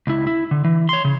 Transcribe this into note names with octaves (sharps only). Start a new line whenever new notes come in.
C#2 E4
E4
D3
E3
C#5 C6
C#3